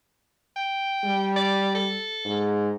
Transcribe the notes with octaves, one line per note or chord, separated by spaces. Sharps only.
G5
G3
D5
A4
G#2